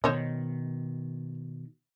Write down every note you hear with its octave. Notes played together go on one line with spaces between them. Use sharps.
B2 D#3 C5 C#5 D#5